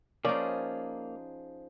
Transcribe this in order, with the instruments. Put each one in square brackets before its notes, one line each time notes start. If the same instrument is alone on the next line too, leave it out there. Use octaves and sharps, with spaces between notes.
[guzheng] F3 G#4 [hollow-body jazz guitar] A#3 [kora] C#4 D#4 [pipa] D5